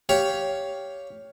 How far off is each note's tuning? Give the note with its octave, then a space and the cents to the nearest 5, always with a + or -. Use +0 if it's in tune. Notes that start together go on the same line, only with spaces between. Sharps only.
G4 +0 C#5 +10 F5 +0